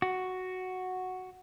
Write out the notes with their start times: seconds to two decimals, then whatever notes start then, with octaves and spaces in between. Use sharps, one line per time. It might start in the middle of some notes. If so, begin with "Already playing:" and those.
0.02 F#4